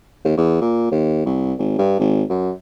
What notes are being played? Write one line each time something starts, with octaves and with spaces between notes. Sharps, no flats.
D#2
E2
A#2
D#2
C2
G#1
G2
G#1
F#2